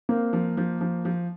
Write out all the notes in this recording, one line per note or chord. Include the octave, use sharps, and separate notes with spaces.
A#3 C4
F3
F3
F3
F3